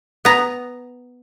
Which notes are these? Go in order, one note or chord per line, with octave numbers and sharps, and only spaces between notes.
B3 A#5